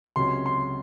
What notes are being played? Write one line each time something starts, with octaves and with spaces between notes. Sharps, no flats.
C#2 C3 F#3 C#4 C6
C6